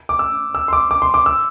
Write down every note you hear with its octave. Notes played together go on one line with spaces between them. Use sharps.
D6
E6
E6
C6
D6
D6
C6
D6
E6